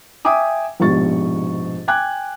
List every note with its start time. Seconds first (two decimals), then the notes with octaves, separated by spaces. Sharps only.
0.25 E5 G5 G#5 D6 D#6
0.80 A#1 G#2 B2 G4 C#6 A6
1.88 G5 G#5 D6 F#6 G#6